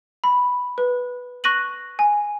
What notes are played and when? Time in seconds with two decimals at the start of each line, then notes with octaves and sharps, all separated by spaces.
0.24 B5
0.78 B4
1.44 C#6 F#6 A#6 D#7 F#7
1.99 G#5